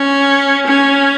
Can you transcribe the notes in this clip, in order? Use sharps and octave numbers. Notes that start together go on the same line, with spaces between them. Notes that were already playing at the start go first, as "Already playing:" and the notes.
Already playing: C#4
C#4